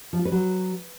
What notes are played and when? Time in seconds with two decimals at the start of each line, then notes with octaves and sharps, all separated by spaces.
0.13 F3
0.19 F4
0.25 B4
0.32 F#3